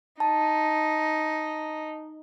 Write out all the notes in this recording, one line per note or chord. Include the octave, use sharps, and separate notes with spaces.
D#4 A5